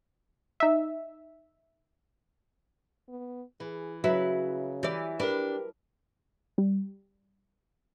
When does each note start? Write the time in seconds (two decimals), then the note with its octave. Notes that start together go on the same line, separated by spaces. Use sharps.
0.60 D#4 E5
3.08 B3
3.60 E3 G#4
4.04 C#3 F#3 E4 B4
4.83 E3 G4 D5
5.20 D4 G4 A#4 B4
6.58 G3